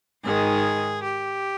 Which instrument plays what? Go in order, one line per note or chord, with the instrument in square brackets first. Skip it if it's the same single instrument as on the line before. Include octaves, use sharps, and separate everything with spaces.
[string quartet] G#2 D#3 G#3 G#4
G4